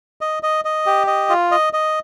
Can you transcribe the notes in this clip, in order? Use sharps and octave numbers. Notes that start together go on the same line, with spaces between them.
D#5
D#5
D#5
G4
D#5
F4
D#5
D#5